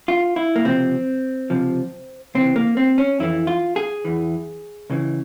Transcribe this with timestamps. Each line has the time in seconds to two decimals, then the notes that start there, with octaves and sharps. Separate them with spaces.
0.08 F4
0.36 E4
0.56 A#3
0.65 C#2 C3 F3 C4
1.50 C#2 C3 F3
2.35 C#2 C3 E3 C4
2.56 A#3
2.77 C4
2.98 C#4
3.20 F2 E3 E4
3.47 F4
3.76 G#4
4.05 E2 E3
4.90 C#2 C#3 E3